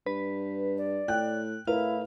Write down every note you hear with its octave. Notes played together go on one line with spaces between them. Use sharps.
G2 B4
D5
A2 G5 F#6
A2 E4 A#4 B4 F5